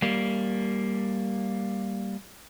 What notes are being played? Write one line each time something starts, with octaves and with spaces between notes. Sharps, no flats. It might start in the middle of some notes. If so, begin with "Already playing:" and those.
G3 A#3